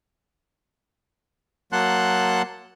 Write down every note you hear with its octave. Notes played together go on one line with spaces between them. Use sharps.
F#3 A#3 F#5 A5 C6 F#6